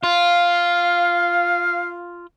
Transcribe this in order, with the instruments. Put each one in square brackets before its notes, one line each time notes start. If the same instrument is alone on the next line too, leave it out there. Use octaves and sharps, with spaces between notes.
[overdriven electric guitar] F4 [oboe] F5